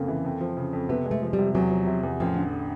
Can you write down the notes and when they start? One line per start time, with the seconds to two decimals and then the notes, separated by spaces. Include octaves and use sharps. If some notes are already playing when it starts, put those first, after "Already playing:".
Already playing: F1 F2 C#3 A#3
0.08 E3
0.24 F2
0.40 F3
0.57 C#3
0.73 F2
0.89 C3 B3
1.06 G#3
1.11 A3
1.22 F3
1.33 G3
1.39 C3
1.55 E2 F#3
1.71 F3
1.87 C3
2.03 E2
2.20 A1 F3
2.36 D3